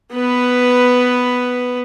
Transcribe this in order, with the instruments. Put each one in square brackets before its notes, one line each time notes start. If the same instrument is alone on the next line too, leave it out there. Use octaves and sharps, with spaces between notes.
[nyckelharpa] B3 B4